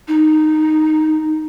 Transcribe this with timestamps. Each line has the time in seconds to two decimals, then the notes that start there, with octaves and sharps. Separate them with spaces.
0.08 D#4